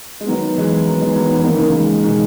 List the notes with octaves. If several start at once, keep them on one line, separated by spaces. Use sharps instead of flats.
G#3
D#3 F#3 B3
E3 G#3
D#3 F#3
E3 G#3
D#3 F#3
E3
D#3 A#3
C#3 E3
G#3
B2 D#3